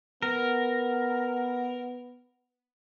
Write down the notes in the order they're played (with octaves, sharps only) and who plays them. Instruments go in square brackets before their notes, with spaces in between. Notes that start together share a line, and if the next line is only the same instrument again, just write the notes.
[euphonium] B3 [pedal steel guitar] A#4